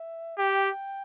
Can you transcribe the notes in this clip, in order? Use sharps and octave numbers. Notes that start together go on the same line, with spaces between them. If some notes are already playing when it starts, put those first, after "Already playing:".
Already playing: E5
G4 G5